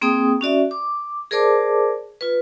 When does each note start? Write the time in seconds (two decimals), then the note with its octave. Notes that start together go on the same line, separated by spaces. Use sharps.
0.01 A#3 C4 G#4 G5 D#6
0.41 C#4 F#4 D5 E5
0.71 D6
1.31 G#4 A#4 C5 D5 A5 D6
2.21 F4 B4